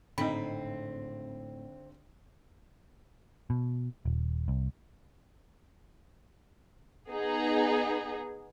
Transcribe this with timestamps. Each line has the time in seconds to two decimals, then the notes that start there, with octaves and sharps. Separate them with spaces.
0.18 G#1 A2 D3 C4 D#4 B5
3.50 B2
4.05 D#1
4.48 C2
7.11 B3 D#4 G#4